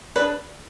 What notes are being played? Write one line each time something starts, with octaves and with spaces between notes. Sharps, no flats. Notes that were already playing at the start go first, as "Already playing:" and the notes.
D4 G#4 B4 D5